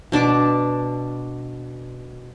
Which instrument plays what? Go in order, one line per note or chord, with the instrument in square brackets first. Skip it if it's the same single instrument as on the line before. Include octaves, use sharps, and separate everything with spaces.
[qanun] B2 D4 A5 D6